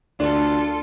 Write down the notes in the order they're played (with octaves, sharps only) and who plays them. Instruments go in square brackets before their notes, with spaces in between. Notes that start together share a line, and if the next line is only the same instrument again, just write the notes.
[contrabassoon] D2 [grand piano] D4 [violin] F4 A4